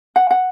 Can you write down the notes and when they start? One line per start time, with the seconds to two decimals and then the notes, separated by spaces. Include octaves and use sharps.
0.16 F#5
0.31 F#5